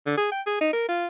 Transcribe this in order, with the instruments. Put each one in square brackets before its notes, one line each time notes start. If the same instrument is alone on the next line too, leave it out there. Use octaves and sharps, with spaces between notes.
[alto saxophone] D3
G#4
G5
G#4
D#4
A#4
F4